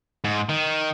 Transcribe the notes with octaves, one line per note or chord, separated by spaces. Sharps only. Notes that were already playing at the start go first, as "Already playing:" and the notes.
G#2
D#3